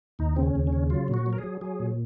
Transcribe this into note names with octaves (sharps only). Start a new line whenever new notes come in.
D#2 D#4
C#3 C4
C#4
D#2
C#4
C#3
F#3 F4
A#2
F#4
F#3
A#4
G#4
F#3
F#3 G#4
A#2